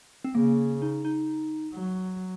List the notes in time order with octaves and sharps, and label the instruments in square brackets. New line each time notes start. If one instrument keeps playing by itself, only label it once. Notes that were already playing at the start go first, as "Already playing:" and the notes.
[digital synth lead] C4
[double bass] C#3 [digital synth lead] A#3
[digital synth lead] D#4
D#4
[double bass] F#3